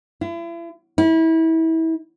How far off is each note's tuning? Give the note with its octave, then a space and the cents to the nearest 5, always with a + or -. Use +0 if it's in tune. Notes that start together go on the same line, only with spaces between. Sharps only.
E4 +40
E4 -30